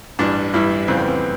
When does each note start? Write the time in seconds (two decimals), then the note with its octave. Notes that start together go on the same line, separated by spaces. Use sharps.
0.19 A1 G2 E3 G3 D4
0.53 A1 G2 E3 G3 E4
0.88 F2 C#3 E3 G3 C4
0.97 B3
1.08 C4